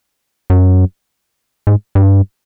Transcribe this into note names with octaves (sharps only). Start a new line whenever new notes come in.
F#2
G#2
G2